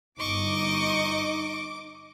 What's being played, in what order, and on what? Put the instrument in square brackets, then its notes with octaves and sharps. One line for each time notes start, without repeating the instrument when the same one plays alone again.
[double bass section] G1 [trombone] D#4 [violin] D#5 C#6 [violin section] D6 D7